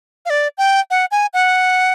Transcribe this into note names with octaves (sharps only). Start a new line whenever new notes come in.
F5
D5
G5
F#5
G#5
F#5